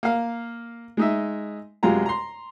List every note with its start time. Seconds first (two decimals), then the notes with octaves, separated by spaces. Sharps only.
0.03 A#3 F5
0.97 G#3 D#4 E5
1.83 F#2 C3 G#3 F4 A#5
2.06 A#5 C6